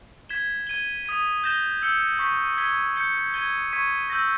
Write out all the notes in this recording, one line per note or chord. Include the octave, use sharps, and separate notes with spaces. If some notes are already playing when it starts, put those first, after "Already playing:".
G#6 B6 E7 G7
G#6 D#7 G7
D#6 G#6 B6 D#7
G6 A#6 E7 G7
E6 G6 C#7 G7
C#6 G6 B6
G#6 B6 G7
G6 C#7 G7
G#6 D#7 G7
C#6 G#6 B6 D#7
E6 G6 A#6